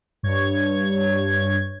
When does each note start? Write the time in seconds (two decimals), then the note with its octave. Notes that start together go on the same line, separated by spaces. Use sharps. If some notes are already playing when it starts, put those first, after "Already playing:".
0.23 G2 C#5 G#6